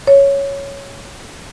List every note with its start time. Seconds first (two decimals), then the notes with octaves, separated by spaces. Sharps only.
0.07 C#5